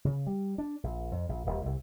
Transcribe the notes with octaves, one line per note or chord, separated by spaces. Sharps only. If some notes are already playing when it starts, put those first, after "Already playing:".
C#3
G3
D4
A#1
F2
A#1
D#1
C2